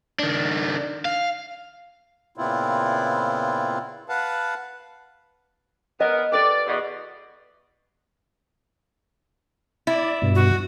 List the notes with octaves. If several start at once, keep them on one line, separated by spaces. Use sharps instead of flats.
D#3 D4
F5
A#2 C#3 B3 C4 E4 F4
B4 F5 F#5 A5
B3 A#4 D#5 G#5
G4 A4 B4 D5
E2 B2
E4 D5
G2 B2
F#4